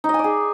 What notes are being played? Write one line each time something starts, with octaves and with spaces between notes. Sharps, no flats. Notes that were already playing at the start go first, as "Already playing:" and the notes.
D#4
D#5
G#5
D5
G#4